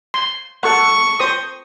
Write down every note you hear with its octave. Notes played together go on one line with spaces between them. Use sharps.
C6
A4 F#5 C#6
C5 D#6